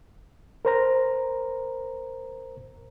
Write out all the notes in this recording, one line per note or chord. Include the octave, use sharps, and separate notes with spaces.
A#4 C5 A#5